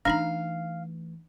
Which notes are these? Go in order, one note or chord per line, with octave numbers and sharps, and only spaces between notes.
E3 A3 D4 D#4 F5 A#5